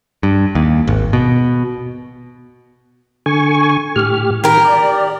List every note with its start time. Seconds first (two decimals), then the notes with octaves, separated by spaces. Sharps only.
0.23 G2
0.55 D#2
0.87 G#1
1.13 B2
3.26 D3 G#5 C#6
3.96 A2 G4 F6
4.44 D#3 G4 A#4
4.65 D5